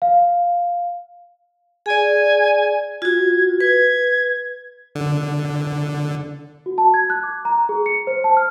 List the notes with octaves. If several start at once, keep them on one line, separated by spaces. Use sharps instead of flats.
F5
G#4 D5 G#5
F4 F#4 G#6
B4 G#6
D3
F#4
A5
G#6
F#6
D6
A#5
G#4
C#7
C5
A5
F6